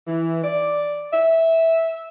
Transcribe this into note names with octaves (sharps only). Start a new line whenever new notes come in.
E3
D5
E5